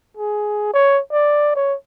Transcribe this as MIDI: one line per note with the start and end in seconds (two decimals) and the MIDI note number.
0.17 0.74 68
0.74 1.00 73
1.12 1.53 74
1.55 1.75 73